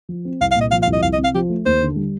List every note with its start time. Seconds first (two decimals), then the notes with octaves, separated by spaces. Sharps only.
0.09 F3
0.25 C4
0.41 C2 F5
0.51 F5
0.56 A#2
0.61 D#5
0.71 F3 F5
0.82 F5
0.87 C2
0.93 D#5
1.02 C2 F5
1.13 D#5
1.19 C3
1.24 F5
1.34 F3 G4
1.49 A3
1.66 D#2 C5
1.81 D3
1.96 G3